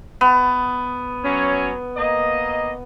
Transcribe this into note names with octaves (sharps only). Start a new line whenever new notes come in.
B3
F#3 C#4
A#3 D#5